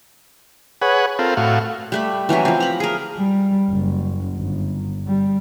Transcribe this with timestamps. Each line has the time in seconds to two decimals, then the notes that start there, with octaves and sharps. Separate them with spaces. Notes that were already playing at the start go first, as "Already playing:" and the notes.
0.82 G#4 B4 C#5 F#5
1.19 C4 F4 A4 A#4
1.37 A2 F#4 F5
1.92 G3 A3 B5
2.29 E3 F#3 C#4 E4
2.45 F3 C4
2.60 A#5 B5
2.80 G#4 A#4
3.18 G3
3.71 F#1
4.37 G1
5.07 G3